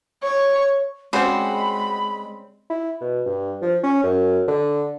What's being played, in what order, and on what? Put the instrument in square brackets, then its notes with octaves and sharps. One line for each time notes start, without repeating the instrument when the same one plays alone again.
[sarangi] C#5
[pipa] C#3 G3 C4 [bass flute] G#3 [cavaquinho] F#4 C5 [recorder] B5
[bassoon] E4
B2
G2
F3
C#4
F#2
D3